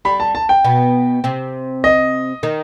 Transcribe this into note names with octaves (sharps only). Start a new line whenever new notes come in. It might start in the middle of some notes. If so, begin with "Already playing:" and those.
G3 G4 B5
A5
A5
G5
B2 B3
C3 C4
D#5
D#3 D#4